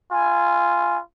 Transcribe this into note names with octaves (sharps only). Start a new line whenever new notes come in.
F4 G#5